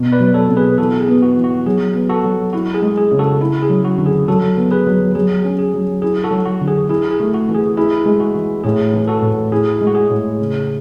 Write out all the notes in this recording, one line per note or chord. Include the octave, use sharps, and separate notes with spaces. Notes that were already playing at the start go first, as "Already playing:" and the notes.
Already playing: B2
B4 D5
F#3
A4 C#5
B2
G#4 B4
E3 F#4 A4
G#4
B3
F#4
E3
F#4
F#3 G#4
B3
F#4 A4
F#3
E4 F#4
G#4
G#3
G#4
C#3
F#4 A4
E4
G#4
F#3
F#4
D3
G#4
F#3 F#4 A4
B3
G#4 B4
F#3
F#3 G#4
C#4
G#4
F#3
E4 G#4
F#4 A4
F#3
F#4
D3
G#4
E4 G#4
G#4
A3
F#4
E3
G#4
E4 G#4
G#3
F#4
E3
A2 G#4
E3
F#4 A4
A2
E4 G#4
G#3
F#4
G#4
A2
C#3